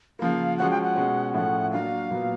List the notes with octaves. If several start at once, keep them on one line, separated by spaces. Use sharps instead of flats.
C#3 F3 A#3 F5
F3 G#3 C#4 F#4 F#5
G5
F#5
B2 G#3 C#4
A2 F3 A3 C#4 E4 F#5
F#3 A#3 D4 F#4 F5
A#2 F#3 B3